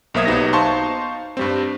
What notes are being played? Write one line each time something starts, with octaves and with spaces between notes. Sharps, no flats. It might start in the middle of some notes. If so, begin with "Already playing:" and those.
B1 A#3 C5 E5 D#6 G#6
B1 F#3 B3 D#4 G4 A#6
D#4 C5 F5 A5 C6 C#6
G2 G3 C4